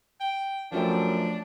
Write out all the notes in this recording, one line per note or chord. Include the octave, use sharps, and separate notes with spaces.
G5
F#2 F3 A3 D4 G5